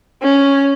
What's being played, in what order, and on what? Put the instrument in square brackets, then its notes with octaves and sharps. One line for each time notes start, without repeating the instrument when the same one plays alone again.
[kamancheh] C#4